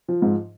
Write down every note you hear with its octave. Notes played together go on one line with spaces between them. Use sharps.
F3
G#2